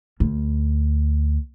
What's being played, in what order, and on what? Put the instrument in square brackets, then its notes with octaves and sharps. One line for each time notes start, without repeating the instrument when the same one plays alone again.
[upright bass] D2